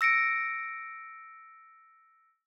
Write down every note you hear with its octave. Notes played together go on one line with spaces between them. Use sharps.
E6 A#6 C#7 D7